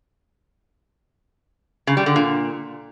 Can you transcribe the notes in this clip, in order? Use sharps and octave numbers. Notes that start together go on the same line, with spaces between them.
C#3
G3
D3
A#2